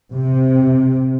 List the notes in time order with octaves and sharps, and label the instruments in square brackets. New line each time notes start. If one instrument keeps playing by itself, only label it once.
[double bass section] C3